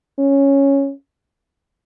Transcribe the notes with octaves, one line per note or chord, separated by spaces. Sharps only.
C#4